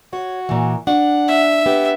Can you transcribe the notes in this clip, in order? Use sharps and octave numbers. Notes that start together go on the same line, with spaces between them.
F#4 C#5
A#2 E3
D4 F#5
E5
B3 G4